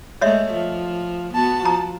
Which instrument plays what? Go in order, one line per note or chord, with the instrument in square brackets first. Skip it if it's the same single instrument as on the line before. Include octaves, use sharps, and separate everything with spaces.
[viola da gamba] G#3 A3 [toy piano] C#5 D#5 E5
[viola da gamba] F3
[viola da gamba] B3 F#4 [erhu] A5
[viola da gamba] F3 [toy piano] A#5